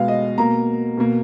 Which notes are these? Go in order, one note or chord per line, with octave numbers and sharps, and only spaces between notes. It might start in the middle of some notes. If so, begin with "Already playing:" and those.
Already playing: B2 G#3 B3 F5
D#5
B2 A#3 A#5
B2 A#3